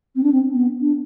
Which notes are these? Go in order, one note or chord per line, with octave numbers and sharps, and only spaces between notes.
C4
D4
C4
B3
D4